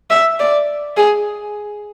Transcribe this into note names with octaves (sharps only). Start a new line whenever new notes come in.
E5
D5
G#4